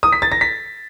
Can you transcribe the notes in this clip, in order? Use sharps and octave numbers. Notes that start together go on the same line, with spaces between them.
D#6
B6
A6
A#6
B6